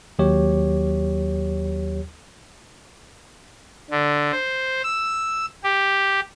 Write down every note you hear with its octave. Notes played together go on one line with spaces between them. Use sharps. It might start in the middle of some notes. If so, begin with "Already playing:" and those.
D#2 F#3 G4 C#5
D3
C5
E6
G4